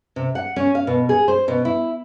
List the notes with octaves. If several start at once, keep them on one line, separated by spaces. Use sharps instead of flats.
C3
F#5
C#4
F5
B2
G#4
C5
B2
E4